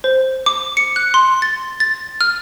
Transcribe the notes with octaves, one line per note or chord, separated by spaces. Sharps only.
C5
D6
C#7
F#6
C6
A6
A6
F6